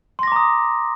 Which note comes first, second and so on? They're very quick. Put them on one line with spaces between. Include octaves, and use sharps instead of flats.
C6 A#6 D6 A#5 D#6